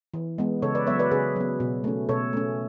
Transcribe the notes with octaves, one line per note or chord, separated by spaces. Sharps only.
E3
G#3 B3
C#3 A4 C#5
B4 D5
F#3 B3 C#5 E5
B4 D5
C#3 G#4 B4
F#3 B3
B2
A3 C#4
B2 A4 C#5
A3 C#4